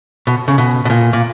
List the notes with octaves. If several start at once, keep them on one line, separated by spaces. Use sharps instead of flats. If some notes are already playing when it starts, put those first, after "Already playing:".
B2
C#3
B2
B2
A#2
A#2